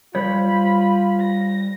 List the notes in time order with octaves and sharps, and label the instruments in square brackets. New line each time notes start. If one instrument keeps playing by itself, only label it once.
[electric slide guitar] G3 C5 C#5 [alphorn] F4 [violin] B5
[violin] A#6